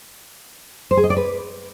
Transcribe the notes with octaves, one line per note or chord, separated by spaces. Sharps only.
C5
G#4
D#5
D5
B4